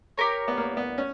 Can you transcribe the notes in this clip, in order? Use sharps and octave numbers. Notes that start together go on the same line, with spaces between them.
G4 A#4 C#5
B3
A#3
B3
C#4